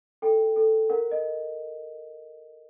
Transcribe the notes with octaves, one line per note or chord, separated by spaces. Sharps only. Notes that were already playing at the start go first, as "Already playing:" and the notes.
A4 G5
A4
A#4 F#5
D#5